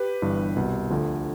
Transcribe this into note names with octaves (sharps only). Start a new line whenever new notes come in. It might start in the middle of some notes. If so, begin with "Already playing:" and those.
Already playing: G4 B4
G1 G2 E3
C2 B2
D2 D3 F3